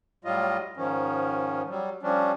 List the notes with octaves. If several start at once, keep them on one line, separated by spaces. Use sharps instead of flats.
A2 F#3 G3 F4 D#5
G#2 D#3 F3 C#4
F#3 G3
F3 G3 C#4 D4